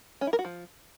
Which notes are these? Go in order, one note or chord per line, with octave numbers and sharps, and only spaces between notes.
C#4
E4
A#4
F#4
F3